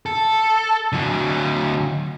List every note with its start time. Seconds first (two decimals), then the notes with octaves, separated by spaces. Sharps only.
0.06 A4
0.92 D3 F#3